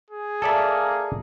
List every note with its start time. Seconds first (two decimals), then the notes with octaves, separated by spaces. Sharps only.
0.11 G#4
0.42 A#3 A4 D5 E5